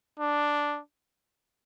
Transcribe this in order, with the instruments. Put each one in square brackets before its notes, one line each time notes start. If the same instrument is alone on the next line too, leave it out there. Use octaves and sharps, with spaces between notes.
[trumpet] D4